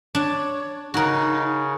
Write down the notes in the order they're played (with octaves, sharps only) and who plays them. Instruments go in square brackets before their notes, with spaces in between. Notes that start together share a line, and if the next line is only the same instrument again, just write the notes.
[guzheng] D4 [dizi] C#5
[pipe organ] C#3 [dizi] D#4 [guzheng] F#4 A#4